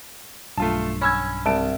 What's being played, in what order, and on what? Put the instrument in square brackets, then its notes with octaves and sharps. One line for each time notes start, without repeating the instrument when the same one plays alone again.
[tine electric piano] B1 G2 [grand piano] A3 F4 A5
[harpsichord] C#4 [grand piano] B5 E6 G#6
[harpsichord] C2 [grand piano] A5 D7